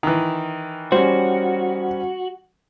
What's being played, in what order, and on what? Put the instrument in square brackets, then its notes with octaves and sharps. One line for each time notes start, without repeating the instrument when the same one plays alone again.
[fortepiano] D#3 E3
[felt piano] G3 C#4 [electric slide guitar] F#4 [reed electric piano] C5